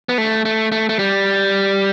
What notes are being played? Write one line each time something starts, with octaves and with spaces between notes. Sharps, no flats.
B3
A3
A3
A3
A3
G3